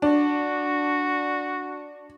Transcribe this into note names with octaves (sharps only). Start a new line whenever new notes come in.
D4 F#4